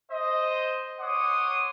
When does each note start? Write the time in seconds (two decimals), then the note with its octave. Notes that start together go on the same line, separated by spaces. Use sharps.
0.12 C5 D#5
1.01 C#5 F#5 C6 D6 D#6